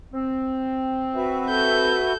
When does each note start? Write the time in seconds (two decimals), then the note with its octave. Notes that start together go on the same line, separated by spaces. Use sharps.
0.14 C4
1.15 F#4 B4 E5
1.48 A4 G6